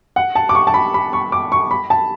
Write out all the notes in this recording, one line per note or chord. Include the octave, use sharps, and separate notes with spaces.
F#5
A5
D6
C#6
A5
B5
B5
C#6
D6
C#6
B5
A5